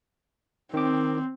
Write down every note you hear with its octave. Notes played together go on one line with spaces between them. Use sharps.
D#3 C4 D6